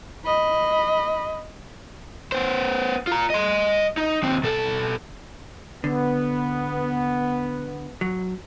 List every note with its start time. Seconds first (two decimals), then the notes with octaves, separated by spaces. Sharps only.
0.25 D#5 B5
2.32 B3 C5
3.07 F4 A#5
3.30 D#5 C6
3.97 D#4
4.23 D#2 C4
4.43 B2 A4
5.84 D3 B3
8.01 F#3